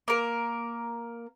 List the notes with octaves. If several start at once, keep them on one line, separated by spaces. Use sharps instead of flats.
A#3 A#4